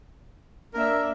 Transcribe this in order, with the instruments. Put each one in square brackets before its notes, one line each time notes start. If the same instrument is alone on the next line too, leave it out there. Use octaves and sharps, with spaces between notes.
[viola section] A#3 D4 E5 [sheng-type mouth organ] A#4